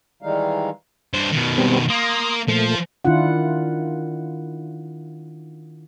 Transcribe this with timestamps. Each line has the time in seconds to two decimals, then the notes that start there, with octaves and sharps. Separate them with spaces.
0.23 D#3 E3 G3 G#3 D#4 F5
1.14 G2 C5
1.33 B2 D#3
1.58 G3 B3 C4
1.90 A#3 C6 D#6 A#6
2.48 A#2 F3 A3
3.05 D#3 D4 E4 F4 F#5